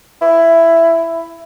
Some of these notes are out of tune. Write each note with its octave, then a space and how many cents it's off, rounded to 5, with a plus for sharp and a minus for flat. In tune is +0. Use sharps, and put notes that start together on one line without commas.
E4 +10